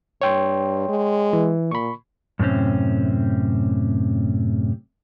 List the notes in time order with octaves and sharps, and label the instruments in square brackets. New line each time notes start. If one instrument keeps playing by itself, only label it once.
[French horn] G2 [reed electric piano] C#5 G5 C6
[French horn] G#3
[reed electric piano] E3
[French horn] A#2 [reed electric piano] B5 C#6
[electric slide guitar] F#2 A2 C3 C4 C#4